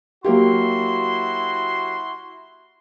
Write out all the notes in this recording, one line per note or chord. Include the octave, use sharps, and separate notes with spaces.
F#3 A#3 E4 F#4 G4 C6